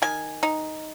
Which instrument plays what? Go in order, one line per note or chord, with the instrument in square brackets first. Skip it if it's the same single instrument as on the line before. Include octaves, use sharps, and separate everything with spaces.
[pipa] D#3 G#5
D#4